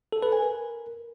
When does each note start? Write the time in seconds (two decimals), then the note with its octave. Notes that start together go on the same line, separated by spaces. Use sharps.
0.12 A4
0.23 B4
0.33 G#5
0.43 A#4